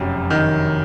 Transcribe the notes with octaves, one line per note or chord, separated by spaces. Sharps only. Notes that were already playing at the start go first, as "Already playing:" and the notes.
Already playing: F1 F#2
D#3